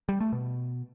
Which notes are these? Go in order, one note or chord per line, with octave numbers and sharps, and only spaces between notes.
G3
A3
B2